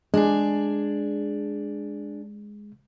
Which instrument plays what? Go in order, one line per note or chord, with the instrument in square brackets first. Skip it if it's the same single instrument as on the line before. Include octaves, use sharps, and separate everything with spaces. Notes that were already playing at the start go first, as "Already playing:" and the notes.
[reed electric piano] G#3 [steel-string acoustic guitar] D4 G#4